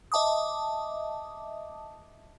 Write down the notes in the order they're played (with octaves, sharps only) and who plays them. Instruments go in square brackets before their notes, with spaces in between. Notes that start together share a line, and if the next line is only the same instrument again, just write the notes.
[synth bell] D#5 E5 A5 D6 D#6